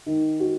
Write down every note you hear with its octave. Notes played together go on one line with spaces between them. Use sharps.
D#3
F#4